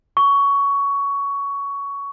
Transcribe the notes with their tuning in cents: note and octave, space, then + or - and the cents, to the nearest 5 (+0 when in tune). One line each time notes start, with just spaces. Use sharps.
C#6 +15